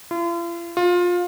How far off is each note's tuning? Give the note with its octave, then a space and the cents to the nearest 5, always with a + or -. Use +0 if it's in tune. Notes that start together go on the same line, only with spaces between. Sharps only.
F4 -45
F4 +20